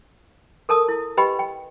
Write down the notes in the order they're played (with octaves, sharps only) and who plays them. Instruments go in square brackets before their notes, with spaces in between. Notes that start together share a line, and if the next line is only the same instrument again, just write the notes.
[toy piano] A4 A#4 A5 D#6
E4
G4 B4 D#5 G5 B5
G5